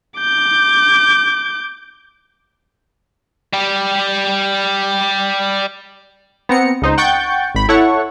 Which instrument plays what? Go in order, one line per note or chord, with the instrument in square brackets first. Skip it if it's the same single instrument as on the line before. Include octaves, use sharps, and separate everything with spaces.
[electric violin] D6 G6
[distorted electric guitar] G3 G4
[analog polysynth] B3 C4 A#5 C#7
C#2 D#4 C5
F#5 G5 C#6 G6 A6
G#1 B5
E4 A4 C#5 F#5 C#6